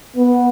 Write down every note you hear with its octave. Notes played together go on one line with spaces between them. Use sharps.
B3